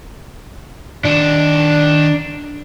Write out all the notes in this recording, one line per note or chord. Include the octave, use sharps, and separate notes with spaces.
D#3 D4 F#5